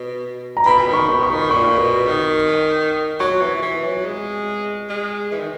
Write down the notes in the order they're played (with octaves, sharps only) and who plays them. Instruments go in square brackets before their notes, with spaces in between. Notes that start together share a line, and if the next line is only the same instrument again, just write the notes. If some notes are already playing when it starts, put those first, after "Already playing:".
Already playing: [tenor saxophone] B2
[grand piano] A#5
[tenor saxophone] B2 [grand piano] B5
[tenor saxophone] D#3
[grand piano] C#6
[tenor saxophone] B2
[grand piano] C#6
[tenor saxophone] D#3
[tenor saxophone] A#2 [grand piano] C#6
[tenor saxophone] B2
D#3
[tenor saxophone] F#3 [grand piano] C#6
[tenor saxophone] E3
E3
F#3
G#3
G#3
E3
D#3